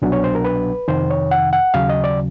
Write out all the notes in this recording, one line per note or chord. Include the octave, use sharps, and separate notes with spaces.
C2 B2 F#3 B3 D4
C#5
C5
A#4
B4
F2 C3 D#3 C5
C#5
F#5
F#5
D#2 C#3 F#3 F5
D#5
D5